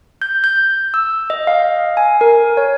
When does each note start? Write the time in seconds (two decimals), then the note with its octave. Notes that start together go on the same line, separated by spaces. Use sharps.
0.22 G6
0.44 G6
0.94 E6
1.30 D#5
1.47 F5
1.97 G#5
2.21 A#4
2.57 C#5